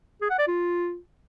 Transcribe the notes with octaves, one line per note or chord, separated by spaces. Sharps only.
G#4
F#5
D5
F4